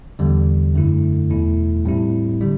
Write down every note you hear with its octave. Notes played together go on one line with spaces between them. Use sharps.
E2 D3 G3
F#2 D3 A3 E4
E2 B2 A3 E4
A2 G3 C4 E4
D3 G3 D4